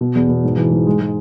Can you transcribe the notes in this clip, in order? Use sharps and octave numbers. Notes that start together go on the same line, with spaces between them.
B2
E2
B2
G#2
E3
G#2
G#3
G#3